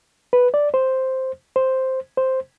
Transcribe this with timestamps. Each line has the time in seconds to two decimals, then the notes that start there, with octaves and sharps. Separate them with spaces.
0.33 B4
0.54 D5
0.74 C5
1.56 C5
2.17 C5